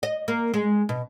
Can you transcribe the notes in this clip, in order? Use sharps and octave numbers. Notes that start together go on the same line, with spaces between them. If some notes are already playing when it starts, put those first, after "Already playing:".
D#5
A#3
G#3
B2